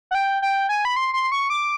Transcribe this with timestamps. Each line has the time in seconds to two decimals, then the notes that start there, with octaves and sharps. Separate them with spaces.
0.11 F#5
0.15 G5
0.42 G5
0.69 G#5
0.85 B5
0.96 C6
1.13 C6
1.32 C#6
1.50 D6